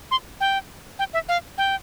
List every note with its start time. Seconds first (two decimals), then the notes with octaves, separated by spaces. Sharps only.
0.11 C6
0.41 G5
0.99 G5
1.14 E5
1.29 F5
1.58 G5